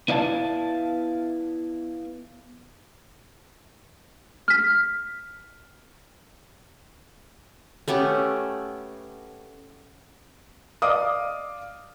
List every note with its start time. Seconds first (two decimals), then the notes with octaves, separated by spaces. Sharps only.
0.08 B3 E4 D5 F5 G5 A5
4.48 F6 B6
7.88 A3 B3 C#4 G4
10.82 D5 D#5 F5 D6 D#6